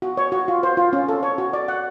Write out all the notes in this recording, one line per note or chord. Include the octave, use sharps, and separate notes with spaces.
F#4
C#5
F#4
F4
C5
F4
C#4
A4
C#5
F#4
D5
F#5